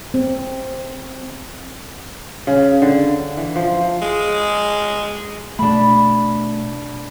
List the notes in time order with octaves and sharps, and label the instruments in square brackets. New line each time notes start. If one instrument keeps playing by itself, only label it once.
[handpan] C4
[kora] C#3
D3
E3
F3
[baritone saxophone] G#3
[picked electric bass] B2 A3 [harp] D4 B5